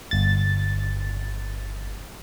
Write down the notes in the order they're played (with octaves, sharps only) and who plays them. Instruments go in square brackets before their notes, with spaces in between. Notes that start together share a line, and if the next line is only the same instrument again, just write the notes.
[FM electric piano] G1 A6